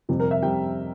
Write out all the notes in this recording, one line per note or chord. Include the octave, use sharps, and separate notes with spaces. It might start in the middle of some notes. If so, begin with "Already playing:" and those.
F2 C3 G3 C4
A#4
E5
C3 G3 C4 G5